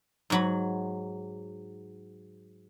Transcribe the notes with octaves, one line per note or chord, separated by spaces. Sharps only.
G#2 F#3 B5